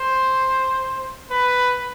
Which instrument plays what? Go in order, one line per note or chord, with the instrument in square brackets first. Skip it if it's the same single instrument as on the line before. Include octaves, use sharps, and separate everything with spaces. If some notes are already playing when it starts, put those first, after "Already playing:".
Already playing: [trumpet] C5
B4